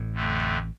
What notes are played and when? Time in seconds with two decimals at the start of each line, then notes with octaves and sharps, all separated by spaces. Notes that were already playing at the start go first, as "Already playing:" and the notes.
Already playing: A1 A2
0.12 F2 D3 A3